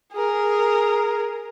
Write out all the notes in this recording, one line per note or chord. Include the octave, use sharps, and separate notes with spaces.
G#4 A#4